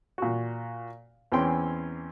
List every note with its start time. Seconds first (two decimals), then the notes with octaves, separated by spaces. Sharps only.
0.18 A#2 F#4
1.32 E2 E3 C4 C#4 G5 C6